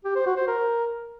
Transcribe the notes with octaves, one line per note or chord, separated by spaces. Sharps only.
G4
C5
F#4
C5
A#4